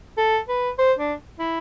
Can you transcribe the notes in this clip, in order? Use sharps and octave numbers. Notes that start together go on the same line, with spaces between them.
A4
B4
C5
D4
E4